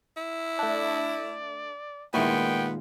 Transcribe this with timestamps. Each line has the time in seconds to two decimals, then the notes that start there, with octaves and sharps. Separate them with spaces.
0.17 E4
0.59 A3 D4 D5
2.14 A#2 D#3 G#3 B3 E4 G5 C#6